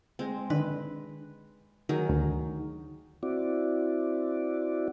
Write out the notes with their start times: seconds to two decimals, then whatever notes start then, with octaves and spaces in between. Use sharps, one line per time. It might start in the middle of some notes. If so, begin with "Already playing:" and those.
0.19 G#3 C4
0.50 D3 D#3 B4
1.89 D#3 F#3 G#4
2.09 D2
3.23 C4 E4 F#4 D5